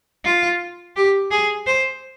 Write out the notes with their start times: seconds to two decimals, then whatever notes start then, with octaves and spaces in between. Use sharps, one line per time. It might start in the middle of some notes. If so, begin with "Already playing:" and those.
0.24 F4
0.96 G4
1.31 G#4
1.67 C5